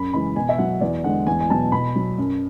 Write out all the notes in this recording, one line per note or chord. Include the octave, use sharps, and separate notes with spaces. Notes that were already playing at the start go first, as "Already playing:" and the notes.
Already playing: F#2 B5
C#3 E3 G#3 B5
B2 G#5
E5
F#3 F#5
E2 D5
D3 G#3 F#5
E2 G#5
G#5
B2 F#3 A5
B2 B5
F#3
F#2